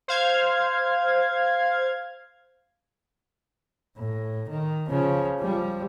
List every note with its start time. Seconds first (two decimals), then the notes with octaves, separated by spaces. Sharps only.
0.08 C5 F5 G#6
3.97 A2
4.48 D#3
4.89 C#3 F3
5.40 F3 G3